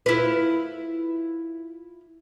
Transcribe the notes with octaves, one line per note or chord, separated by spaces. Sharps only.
E4 F4 B4